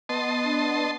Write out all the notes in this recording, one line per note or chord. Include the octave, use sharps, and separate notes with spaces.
B3 D#5 A5 C6
D4